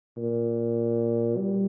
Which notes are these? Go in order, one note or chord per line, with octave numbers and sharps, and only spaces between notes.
A#2
G3